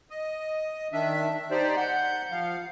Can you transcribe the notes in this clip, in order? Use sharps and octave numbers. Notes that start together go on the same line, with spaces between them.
D#5
D#3 D4 E5
D#4 G4 C5 D5
F#5 G6
F3 F5